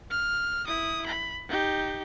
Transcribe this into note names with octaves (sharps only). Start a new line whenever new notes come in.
F6
E4 D#6
B5
D#4 G4